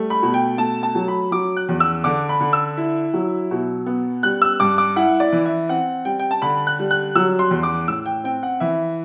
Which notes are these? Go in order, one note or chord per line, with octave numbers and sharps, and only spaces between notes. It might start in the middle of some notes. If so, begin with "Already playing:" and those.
Already playing: G3 A3
B5
B2
G5
A3 A5
A5
F#3
B5
F#3 D6
F#6
E2
E6
D3 D6
B5
D3
E6
E4
F#3
B2
B3
G3 F#6
E6
G2 D6
D6
E4 F#5
D5
E3
E5
C4 F#5
G3 G5
G5
A5
D3 B5
F#6
G3
F#6
F#3 E6
C6
E2
D6
A2 E6
G5
C4 G5
F#5
E3 E5